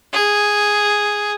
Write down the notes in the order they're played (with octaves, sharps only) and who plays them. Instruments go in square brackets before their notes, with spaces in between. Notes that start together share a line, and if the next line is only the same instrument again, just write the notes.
[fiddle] G#4